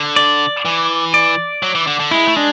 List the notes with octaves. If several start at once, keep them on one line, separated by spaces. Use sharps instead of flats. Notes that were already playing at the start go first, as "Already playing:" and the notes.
Already playing: D3
D5
E3
D5
F#3
E3
D3
D3
G#3 E4
A3
G#3 D4